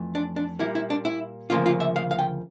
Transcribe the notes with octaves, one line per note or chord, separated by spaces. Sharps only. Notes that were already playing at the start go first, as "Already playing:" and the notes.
Already playing: F2 E3 A3
D4
D4
A#2 G3 A#3 E4
E4
D4
E4
D2 C#3 F3 A#3 F4
F4
E5
F5
F5
G5